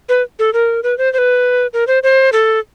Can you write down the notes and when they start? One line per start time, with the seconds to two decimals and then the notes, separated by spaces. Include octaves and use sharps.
0.09 B4
0.39 A4
0.53 A#4
0.83 B4
0.98 C5
1.13 C5
1.18 B4
1.73 A#4
1.87 C5
2.03 C5
2.32 A4